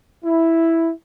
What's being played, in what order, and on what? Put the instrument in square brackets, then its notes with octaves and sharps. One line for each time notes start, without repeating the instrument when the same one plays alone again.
[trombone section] E4